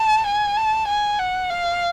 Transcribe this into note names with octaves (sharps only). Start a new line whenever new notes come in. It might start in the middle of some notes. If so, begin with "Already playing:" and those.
Already playing: A5
G#5
A5
G#5
F#5
F5